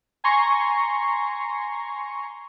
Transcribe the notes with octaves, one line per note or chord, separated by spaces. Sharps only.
G#5 A#5 C6 C#6